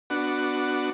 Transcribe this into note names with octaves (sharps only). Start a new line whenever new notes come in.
B3 D4 F#4